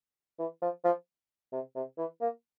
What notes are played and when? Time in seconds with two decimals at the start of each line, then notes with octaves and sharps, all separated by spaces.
0.39 E3
0.62 F3
0.84 F3
1.52 C3
1.75 C3
1.98 E3
2.21 A#3